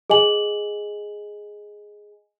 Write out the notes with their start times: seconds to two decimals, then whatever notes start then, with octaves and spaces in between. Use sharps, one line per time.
0.10 G#4 D#5 G#5 F#7